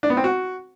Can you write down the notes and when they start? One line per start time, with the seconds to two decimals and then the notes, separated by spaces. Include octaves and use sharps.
0.03 D4
0.10 B3
0.17 C4
0.24 F#4